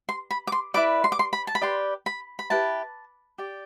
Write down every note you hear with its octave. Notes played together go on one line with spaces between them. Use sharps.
C6
B5
D6
C6
E4 B4 D5 D6
C6
D6
C6
B5
A5
B5
G4 B4 D5 C6
B5
B5
E4 G4 B4 A5
G4 D5